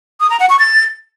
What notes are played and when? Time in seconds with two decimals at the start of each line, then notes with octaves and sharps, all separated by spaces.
0.20 D#6
0.30 A#5
0.40 F#5
0.50 C#6
0.59 A6